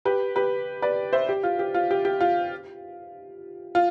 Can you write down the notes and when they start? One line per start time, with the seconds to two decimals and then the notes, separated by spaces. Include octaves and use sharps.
0.05 G4 B4
0.36 G4 B4
0.82 B4 D5
1.13 C5 E5
1.29 G4
1.43 F4
1.59 G4
1.74 F4
1.91 G4
2.05 G4
2.21 F4
3.75 F4